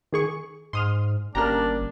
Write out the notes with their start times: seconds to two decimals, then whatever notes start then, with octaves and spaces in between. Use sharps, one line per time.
0.12 D#3 G#4 C#6
0.73 G#2 C6 D#6 F6
1.35 G1 A#3 C#4 D4 G4 A#5 F6